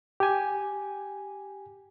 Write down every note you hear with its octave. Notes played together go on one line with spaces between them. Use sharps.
G4 G#5